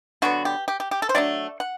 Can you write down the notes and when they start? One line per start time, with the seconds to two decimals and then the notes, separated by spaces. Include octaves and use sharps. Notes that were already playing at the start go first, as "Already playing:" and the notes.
0.22 D3 F#3 B3 F#4
0.45 G4
0.68 G4
0.80 G4
0.91 G4
1.02 A4
1.09 C5
1.14 F#3 A3 D4 D5
1.60 F#5